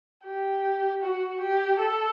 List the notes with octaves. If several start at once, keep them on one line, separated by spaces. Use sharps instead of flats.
G4
F#4
G4
A4